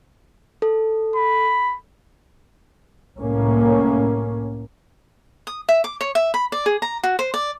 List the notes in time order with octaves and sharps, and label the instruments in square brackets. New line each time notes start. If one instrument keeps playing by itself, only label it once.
[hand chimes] A4
[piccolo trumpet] B5
[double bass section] C2 A2 A#3 C#4
[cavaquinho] D#6
E5
D6
C#5
E5
B5
D5
G#4
A#5
F#4
C5
D5